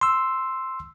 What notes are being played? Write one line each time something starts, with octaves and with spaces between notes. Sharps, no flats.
C6 E6